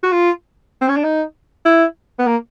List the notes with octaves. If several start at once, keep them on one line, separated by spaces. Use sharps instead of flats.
F#4
F4
C4
C#4
D4
D#4
E4
B3
A#3